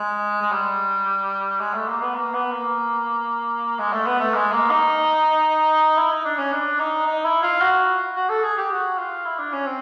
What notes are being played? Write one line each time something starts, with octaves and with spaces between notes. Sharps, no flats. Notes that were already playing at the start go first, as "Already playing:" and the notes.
Already playing: G#3
G#3
G3
G#3
A3
A#3
B3
A#3
B3
A#3
G#3
A3
B3
A3
G#3
A#3
D#4
E4
D#4
D4
C#4
D4
D#4
D#4
E4
F4
F#4
F#4
A4
G#4
G4
F#4
F4
E4
D4
C#4
C4